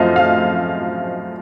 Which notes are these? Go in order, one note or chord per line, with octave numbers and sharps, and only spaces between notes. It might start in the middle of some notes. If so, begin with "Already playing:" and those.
Already playing: F#2 F3 A3 C4 D#5 F5
F5